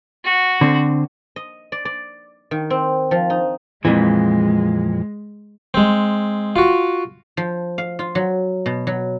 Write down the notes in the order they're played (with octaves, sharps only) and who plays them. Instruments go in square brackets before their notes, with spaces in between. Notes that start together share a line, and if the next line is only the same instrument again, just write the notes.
[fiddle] F#4
[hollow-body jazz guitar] D3 C4
[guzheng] D#5
D5
D5
D#3
C4
F3
D#4
[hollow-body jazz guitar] F2 A#2 E3 [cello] G#3
[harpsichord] G#3 C4
F4 F#4
[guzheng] F3
F5
F4
F#3
B2
F#3